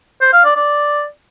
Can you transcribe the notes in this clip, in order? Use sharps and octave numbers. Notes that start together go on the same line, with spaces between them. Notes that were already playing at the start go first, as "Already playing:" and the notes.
C5
F5
D5
D5